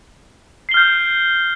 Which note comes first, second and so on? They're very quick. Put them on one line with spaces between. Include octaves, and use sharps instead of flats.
C7 G7 F6 G6